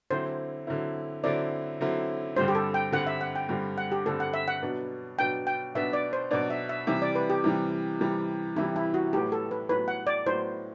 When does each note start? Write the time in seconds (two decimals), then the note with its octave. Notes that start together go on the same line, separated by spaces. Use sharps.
0.10 D3 F#3 C4 E4 C5
0.67 D3 F#3 C4 E4
1.24 D3 F#3 C4 E4 D5
1.81 D3 F#3 C4 E4
2.36 G2 D3 G3 C4 C5
2.48 G4
2.55 A4
2.74 G5
2.92 G2 D3 G3 C4 F#5
3.07 E5
3.21 F#5
3.36 G5
3.49 G2 D3 G3 C4
3.78 F#5
3.92 G4
4.06 G2 D3 G3 C4 A4
4.20 F#5
4.34 E5
4.48 F#5
4.62 B2 F#3 B3 D4
5.18 B2 F#3 B3 D4 G5
5.47 G5
5.75 B2 F#3 B3 D4 E5
5.93 D5
6.13 C5
6.31 B2 F#3 B3 D4 D5
6.50 E5
6.69 E5
6.87 C3 E3 G3 E5
7.02 D5
7.15 B4
7.30 G4
7.44 C3 E3 G3
8.01 C3 E3 G3
8.56 C3 E3 G3 E4
8.76 E4
8.94 F#4
9.13 A2 F#3 B3 G4
9.32 A4
9.51 B4
9.69 A2 F#3 B3 B4
9.88 F#5
10.07 D5
10.26 A2 F#3 B3 C5